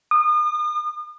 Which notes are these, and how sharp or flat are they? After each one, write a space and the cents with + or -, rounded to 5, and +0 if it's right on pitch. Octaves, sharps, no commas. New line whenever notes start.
D#6 -40